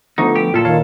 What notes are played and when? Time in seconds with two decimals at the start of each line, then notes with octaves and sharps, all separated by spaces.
0.18 D3 F3 A3 B3 D#4 C#6
0.36 G4
0.54 A#2 F4 A4
0.65 D#3 C#5 F5 A5